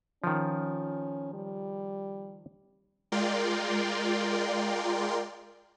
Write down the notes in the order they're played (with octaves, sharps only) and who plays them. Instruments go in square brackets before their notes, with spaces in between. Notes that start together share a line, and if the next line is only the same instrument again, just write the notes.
[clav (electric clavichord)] D#3 F3 [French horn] C#4
[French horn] G3
[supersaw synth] G#3 F4 A#4 D5 G5 C6